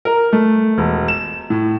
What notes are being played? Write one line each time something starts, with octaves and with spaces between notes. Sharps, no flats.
A#4
A3
E1
E7
A2